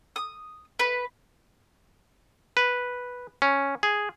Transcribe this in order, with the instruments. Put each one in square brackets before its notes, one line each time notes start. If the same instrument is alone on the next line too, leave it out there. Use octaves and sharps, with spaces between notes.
[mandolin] D#6
B4
[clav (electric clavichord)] B4
C#4
G#4